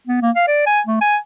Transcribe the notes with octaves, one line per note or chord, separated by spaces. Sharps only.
B3
A#3
F5
D5
G#5
A3
G#5